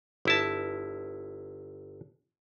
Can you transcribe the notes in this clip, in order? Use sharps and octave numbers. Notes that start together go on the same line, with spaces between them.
G1 E4 A5